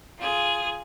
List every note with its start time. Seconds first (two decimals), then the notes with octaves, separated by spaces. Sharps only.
0.19 F4 G#4